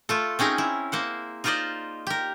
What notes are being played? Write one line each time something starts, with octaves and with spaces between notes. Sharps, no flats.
A3 F4 A4
C4 C#4 D#4 G#4 A#4
E4
A#3 C5 F#5
D#4 F4 A#4 C5 D5 D#5
G4 A#4